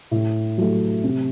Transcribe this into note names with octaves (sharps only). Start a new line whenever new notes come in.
A2
F#3 A3
C3